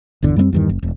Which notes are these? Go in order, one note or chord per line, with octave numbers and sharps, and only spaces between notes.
G1 E2 D3
F#2 G3 G#3 C4
E2 G2 D#3
F#1
E1